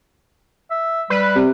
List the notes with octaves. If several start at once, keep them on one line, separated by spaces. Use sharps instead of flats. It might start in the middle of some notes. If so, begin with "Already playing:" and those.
E5
G3 B4
C3